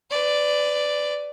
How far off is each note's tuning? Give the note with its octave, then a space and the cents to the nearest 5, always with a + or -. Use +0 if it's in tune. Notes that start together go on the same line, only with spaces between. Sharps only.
B4 +30 D5 +0